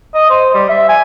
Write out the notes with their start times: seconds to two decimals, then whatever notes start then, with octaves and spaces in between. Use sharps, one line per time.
0.14 D#5
0.30 C5
0.54 G3
0.69 E5
0.89 G#5